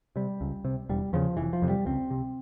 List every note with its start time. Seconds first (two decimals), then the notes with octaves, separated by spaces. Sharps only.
0.16 C3 G3
0.41 C#2
0.65 C3
0.89 E1 G3
1.13 E2 C#3 F3
1.37 F1 E3
1.53 F3
1.62 F2 C3
1.69 G3
1.86 C#2 C4
2.10 C3